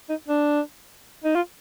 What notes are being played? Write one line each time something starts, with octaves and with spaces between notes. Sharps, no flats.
D#4
D4
D#4
F4